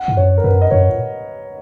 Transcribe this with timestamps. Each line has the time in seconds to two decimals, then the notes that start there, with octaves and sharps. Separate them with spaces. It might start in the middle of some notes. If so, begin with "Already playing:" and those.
Already playing: F#5
0.08 G#2
0.16 F#2 C#5
0.38 A#4
0.44 F#2 B4
0.62 D#5
0.71 F#2 C#5
0.89 A#2